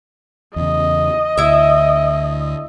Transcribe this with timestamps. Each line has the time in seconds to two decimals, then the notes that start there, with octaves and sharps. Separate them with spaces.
0.56 E2 C#3 D#5
1.37 D2 E4 E5